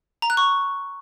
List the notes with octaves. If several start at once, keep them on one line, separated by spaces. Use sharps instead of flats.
A#5
F#6
C#6